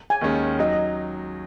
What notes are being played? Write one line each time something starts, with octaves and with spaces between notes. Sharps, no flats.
G#5
D#2 D#3 G#3 C#4
F#3 D#4 D#5